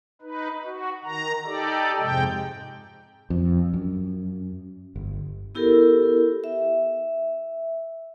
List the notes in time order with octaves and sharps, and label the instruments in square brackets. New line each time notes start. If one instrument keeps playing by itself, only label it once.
[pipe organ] D#4 B4
F#4
D#3 A#5
D#4 G4 A4 D5
F2 G#2 C3 G#3 G5
[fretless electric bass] F2
F#2
G1
[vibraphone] B3 E4 G4 A4 A#4
E5